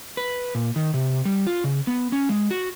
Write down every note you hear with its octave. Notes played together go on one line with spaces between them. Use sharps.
B4
A#2
D#3
C3
G3
F4
C#3
B3
C#4
G#3
F#4